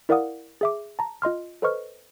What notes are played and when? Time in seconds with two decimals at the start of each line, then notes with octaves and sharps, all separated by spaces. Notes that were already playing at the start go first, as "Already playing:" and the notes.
0.09 E4 A#4 D5 F5 F#5 D#6
0.61 G#4 E5 D6
0.99 A5 A#5
1.22 F4 D#5 C6 F6
1.62 A4 B4 C5 D#5 C#6 F6